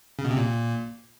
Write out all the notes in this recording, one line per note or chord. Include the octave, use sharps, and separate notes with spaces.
C#3
B2
C3
A#2